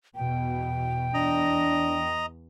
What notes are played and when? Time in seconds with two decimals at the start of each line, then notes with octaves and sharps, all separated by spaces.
0.15 E2 B2 G5
1.14 E2 D4 D#5 A#5